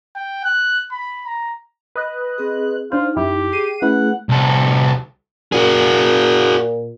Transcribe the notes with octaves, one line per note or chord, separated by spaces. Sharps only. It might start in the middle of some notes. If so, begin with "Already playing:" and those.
G5
F#6
B5
A#5
B4 D#5 F#6
C4 G#4
D4 D#4 F4 C5
F#2 E4 G4
G#4 C7 D#7
A3 C#4 E4 G#4 B4 F#5
C2 A4
A#2 F#4 G#4